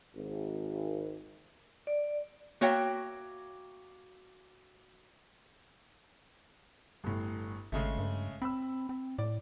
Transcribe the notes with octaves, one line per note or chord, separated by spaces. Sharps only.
G#1
D5
A#3 F#4 C#5 E5 G5
G1 A2
G#1 C#3 G#3 A3
G2
C4 B5 E6
C4
A2 D5